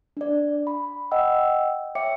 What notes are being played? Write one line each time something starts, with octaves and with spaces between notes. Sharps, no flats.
D4 D5
B5
D#5 F#5 G5 E6
C#5 E5 G5 D6 C#7